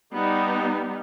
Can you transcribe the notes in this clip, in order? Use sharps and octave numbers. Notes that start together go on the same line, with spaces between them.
G3 B3 D#4